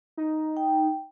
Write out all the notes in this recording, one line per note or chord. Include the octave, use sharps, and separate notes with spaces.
D#4
G5